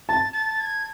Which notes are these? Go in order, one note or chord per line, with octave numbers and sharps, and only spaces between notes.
A5 A6
A6
A6
G#6